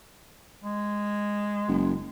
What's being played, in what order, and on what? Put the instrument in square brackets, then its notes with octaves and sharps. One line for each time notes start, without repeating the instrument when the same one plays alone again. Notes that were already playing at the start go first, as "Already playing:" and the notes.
[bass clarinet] G#3
[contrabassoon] F#1